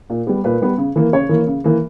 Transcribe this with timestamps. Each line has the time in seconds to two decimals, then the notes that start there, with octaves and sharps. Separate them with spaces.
0.10 A#2
0.27 G3 B3
0.44 A#2 B4
0.62 G3 B3
0.78 C#3
0.96 E3 A#3
1.13 C#3 C#5
1.29 E3 A#3
1.47 C#3
1.64 E3 A#3